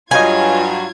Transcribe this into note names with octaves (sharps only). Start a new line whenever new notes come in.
G2 F#3 F4 D#5 F5 G#5 G6 G#6